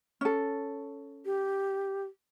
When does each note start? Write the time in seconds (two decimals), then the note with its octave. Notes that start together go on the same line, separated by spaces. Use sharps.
0.21 C#4 A4
1.25 G4